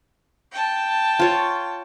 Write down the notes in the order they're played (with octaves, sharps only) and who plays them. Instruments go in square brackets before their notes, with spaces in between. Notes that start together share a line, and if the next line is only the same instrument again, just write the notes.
[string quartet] G5 A5
[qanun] F4 C#5